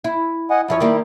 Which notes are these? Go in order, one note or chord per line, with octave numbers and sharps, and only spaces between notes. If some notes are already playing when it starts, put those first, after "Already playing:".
E4
D#5 F#5 G#5
F#2 F3 E4 C#5
D#3 G3 A#3